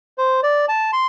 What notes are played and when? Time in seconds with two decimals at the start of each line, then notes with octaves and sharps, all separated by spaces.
0.18 C5
0.43 D5
0.68 A5
0.93 C6